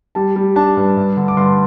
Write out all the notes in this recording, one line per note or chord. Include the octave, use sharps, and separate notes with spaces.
G3 A5
G3
D4 A5
G2
G2
D3
D6
G2 C6